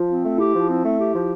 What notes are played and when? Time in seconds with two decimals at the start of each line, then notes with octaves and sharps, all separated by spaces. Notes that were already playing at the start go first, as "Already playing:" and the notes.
Already playing: F3 F4
0.09 C4
0.24 A3
0.38 E4 G4
0.54 F3
0.69 C4
0.84 A3
0.99 G4
1.14 F3